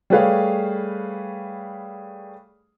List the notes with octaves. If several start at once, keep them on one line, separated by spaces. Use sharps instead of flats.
G3 A3 G#4 B4 C#5 F5